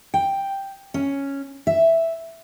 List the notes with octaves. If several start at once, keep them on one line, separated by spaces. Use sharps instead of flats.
G5
C#4
E5